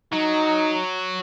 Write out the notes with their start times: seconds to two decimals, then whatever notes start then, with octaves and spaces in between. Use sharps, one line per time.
0.12 F#3 D#4